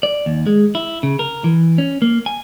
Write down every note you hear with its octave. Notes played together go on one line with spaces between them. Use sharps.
D5
D#2
G#3
E4
C#3
A#4
E3
C#4
A#3
G#5